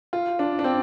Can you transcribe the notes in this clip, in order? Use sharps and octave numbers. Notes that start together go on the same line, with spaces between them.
F4
D4
D4
C4